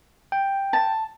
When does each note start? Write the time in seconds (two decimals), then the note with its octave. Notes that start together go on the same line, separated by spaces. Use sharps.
0.32 G5
0.73 A5